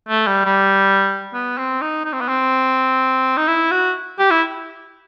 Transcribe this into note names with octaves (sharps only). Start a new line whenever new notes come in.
A3
G3
G3
B3
C4
D#4
D#4
C4
B3
C4
D#4
E4
F#4
G4
E4